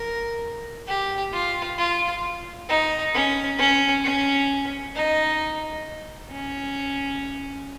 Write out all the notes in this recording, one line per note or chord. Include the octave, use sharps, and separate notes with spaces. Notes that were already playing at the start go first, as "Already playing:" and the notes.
Already playing: A#4
G4
F4
F4
D#4
C#4
C#4
C#4
D#4
C#4